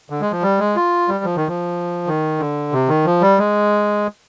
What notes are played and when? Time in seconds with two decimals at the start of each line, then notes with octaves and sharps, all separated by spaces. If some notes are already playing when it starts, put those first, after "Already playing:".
0.10 D3
0.21 G#3
0.32 F3
0.42 G3
0.59 G#3
0.76 F4
1.08 G3
1.24 F3
1.36 D#3
1.48 F3
2.07 D#3
2.39 D3
2.72 C3
2.88 D#3
3.05 F3
3.21 G3
3.38 G#3